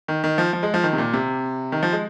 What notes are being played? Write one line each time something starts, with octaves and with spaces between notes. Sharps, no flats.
D#3
D#3
F3
F3
G#3
F3
D#3
C3
A#2
C3
D#3
F3
G#3